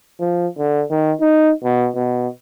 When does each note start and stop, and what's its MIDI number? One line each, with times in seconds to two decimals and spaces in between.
0.19 0.47 53
0.58 0.84 50
0.90 1.12 51
1.21 1.51 63
1.64 1.89 47
1.96 2.28 47